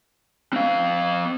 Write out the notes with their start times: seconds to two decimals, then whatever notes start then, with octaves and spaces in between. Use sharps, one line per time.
0.53 C4 F5